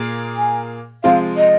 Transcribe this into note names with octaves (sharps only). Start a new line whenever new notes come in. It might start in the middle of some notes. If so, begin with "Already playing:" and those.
Already playing: A#2 A#3 G#4
G#5
C3 F3 G#3 C4 F4 F5
D#5